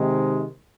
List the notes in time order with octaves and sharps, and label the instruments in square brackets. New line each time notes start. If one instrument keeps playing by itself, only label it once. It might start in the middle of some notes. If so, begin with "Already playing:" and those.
Already playing: [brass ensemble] C3 D#3 G#3